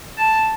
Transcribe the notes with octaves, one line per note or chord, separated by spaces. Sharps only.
A5